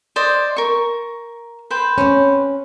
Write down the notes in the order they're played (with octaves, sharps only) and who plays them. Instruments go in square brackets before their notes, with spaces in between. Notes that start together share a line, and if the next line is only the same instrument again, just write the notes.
[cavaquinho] C5 D5 D#5
A#4 C#6
B4 C5 G5
[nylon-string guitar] C4 C#4